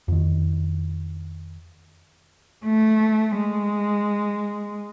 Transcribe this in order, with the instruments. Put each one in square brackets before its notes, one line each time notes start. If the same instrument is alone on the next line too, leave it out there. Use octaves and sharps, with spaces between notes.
[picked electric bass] F2 D#3
[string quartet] A3
G#3